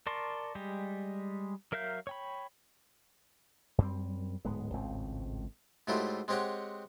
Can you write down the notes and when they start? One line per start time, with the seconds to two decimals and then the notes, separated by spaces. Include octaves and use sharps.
0.07 A#4 D5 A5 C6 C#6
0.55 G3 G#3 G4
1.72 F#3 A#4 E5 F5 G6
2.07 C#5 G5 B5
3.78 F#2 G3 C4
4.45 D1 G#2 G#3 B3
4.73 G#1 C#2 A2 C4
5.87 G#2 F#3 A3 E4 F4 G4
6.28 G#3 C4 G4 C#5 D#5 F#5